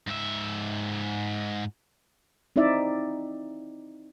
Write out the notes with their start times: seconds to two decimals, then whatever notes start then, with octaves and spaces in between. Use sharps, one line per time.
0.08 G#2 E5
2.56 C4 D#4 E4 D5 E5